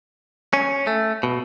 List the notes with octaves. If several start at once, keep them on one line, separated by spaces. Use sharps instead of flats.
C#4
A3
B2